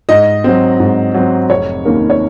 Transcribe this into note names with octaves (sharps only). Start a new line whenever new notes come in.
G#2 D#5
F#3 C4
G#2
F#3 C4
F1 C#5
D#2 D#3 A#3 C#4
C#5